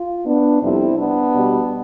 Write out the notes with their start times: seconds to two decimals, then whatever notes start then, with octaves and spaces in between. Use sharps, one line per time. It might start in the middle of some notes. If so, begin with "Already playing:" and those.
Already playing: F4
0.25 B3 D4
0.60 F2 C3 G3 C4 E4
0.97 B3 D4
1.33 B2 G3